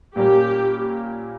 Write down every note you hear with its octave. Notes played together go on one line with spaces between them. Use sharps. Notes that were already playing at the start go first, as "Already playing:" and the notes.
A#2 G3 A#3 C#4 G4